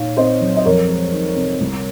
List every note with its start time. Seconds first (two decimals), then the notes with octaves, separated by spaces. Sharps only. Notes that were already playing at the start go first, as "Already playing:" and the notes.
Already playing: A#2 D#4 C#5 F5
0.17 C4 C5 D#5
0.41 F#3
0.56 D#5
0.65 F2 A#4 C#5
0.88 G#3
1.12 D#3
1.36 C3
1.60 C2